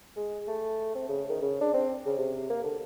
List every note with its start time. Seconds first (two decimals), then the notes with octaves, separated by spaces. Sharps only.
0.17 G#3
0.48 A3
0.95 C4
1.09 C#3
1.29 D#3
1.42 C#3
1.61 D4
1.74 C4
2.06 C#3
2.18 C3
2.50 A#3
2.64 D3